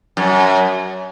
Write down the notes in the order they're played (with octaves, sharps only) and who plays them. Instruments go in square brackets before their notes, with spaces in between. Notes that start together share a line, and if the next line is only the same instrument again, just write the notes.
[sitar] F#2